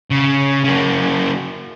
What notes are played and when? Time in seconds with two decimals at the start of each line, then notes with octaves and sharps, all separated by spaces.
0.10 C#3
0.64 C#3 A#3